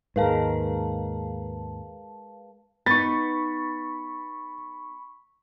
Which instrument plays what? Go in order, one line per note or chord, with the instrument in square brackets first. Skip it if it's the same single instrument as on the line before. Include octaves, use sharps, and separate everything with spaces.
[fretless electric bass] D#2 G#2 [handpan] G#3 A#4 [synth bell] B4 F5 A5
[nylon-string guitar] B3 D#4 [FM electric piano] B5 C#6 [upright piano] A6